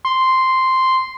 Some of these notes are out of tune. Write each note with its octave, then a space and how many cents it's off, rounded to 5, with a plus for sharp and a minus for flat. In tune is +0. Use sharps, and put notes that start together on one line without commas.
C6 -5